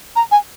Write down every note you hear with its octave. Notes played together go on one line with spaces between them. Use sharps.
A#5
G#5